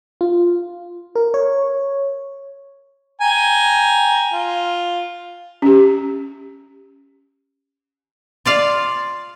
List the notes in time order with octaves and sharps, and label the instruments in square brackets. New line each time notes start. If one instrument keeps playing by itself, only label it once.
[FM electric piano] F4
A#4
C#5
[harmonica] G5 G#5 A#5
F4
[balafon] C#4 G4
[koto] F4 D5 F5